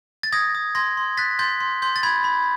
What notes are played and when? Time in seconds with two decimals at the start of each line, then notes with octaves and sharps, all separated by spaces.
0.23 A6
0.33 D#6 G#6 A#6
0.55 D#6
0.75 C6 G#6 A#6
0.97 C6
1.17 F#6 A6 B6
1.39 C6 G6 A6
1.60 C6
1.82 C6 G6
1.96 A6
2.03 B5 G#6
2.24 B5